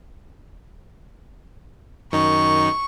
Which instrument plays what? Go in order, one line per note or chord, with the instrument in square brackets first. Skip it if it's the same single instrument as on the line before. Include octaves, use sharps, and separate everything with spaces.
[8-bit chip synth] F#2 D#3 D#4 [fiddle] C#6